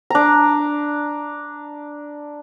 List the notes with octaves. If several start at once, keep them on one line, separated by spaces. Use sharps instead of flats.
D4 A#5